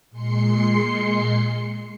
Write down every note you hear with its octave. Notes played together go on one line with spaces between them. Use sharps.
A#2 G#3 C6 C7 C#7